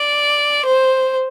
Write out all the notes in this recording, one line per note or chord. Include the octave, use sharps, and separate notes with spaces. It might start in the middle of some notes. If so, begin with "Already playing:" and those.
Already playing: D5
C5